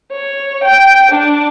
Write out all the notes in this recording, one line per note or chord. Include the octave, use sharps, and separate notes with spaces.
C#5
G5
D4